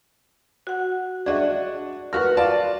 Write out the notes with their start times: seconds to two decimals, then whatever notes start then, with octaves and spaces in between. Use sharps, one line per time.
0.67 F#4 F#5
1.26 D4 F#4 G#4 D#5 E5
2.13 F#4 A#4 B4 F6
2.37 F4 D5 A5